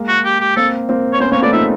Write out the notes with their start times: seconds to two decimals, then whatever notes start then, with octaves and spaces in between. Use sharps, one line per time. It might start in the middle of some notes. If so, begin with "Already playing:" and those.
Already playing: G#3 A#3
0.08 F#4
0.25 G4
0.40 G4
0.56 A#3 C4 A4
0.89 A#3 C4
1.13 C#5
1.20 B3 C#4 C5
1.32 A#3 C4 C#5
1.42 A3 B3 D5
1.52 D#4 F4 E5